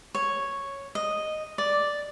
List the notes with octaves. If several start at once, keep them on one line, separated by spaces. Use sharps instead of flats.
C#5
D#5
D5